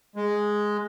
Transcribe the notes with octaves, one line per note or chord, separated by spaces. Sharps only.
G#3